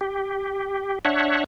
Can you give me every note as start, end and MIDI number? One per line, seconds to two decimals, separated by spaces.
0.01 0.99 67
1.05 1.44 62
1.05 1.44 73
1.05 1.44 76
1.05 1.44 78